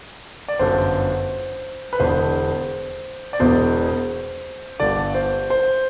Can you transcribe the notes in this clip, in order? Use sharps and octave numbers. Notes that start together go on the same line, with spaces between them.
D5
G1 F#2 D3 C5
B4
E1 E2 D3 C5
D5
E1 E2 B2 C5
G1 G2 D3 D5
C5
C5